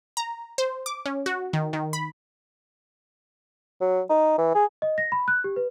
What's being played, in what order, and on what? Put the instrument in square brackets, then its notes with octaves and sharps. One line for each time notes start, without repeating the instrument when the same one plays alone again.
[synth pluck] A#5
C5
D6
C#4
F#4
D#3
D#3
B5
[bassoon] F#3
D#4
E3
G#4
[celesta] D#5
A#6
B5
F#6
G4
B4